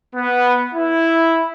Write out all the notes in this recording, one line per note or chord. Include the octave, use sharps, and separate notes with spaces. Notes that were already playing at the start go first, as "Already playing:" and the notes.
B3
E4